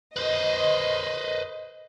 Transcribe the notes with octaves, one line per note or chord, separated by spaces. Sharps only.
B4 C5 D#5